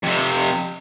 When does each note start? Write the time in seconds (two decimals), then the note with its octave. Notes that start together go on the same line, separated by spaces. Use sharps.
0.03 F2 C3